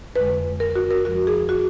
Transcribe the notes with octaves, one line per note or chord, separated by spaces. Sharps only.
F2 D3 G#3 B4
A#4
F#4
A#4
F2 F3 G#3 F#4
G#4
F#4